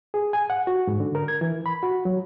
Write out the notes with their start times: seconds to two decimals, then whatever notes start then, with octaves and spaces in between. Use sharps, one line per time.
0.14 G#4
0.33 G#5
0.50 F#5
0.67 F#4
0.87 G#2
1.00 D3
1.15 A#4
1.28 G#6
1.41 E3
1.66 B5
1.83 F#4
2.05 F#3